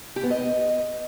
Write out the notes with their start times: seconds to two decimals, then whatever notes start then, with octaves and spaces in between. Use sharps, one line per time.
0.16 G4
0.23 B3
0.30 D#5